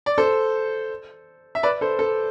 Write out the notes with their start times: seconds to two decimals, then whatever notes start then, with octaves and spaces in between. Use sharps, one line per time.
0.06 D5
0.18 A4 C5
1.55 E5
1.63 B4 D5
1.81 A4 C5
1.99 A4